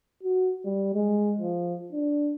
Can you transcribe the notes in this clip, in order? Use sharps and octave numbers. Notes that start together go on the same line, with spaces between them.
F#4
G3
G#3
F3
D4